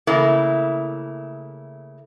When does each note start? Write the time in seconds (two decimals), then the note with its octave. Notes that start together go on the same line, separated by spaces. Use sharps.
0.07 C#3 E3 A3 A#3 E4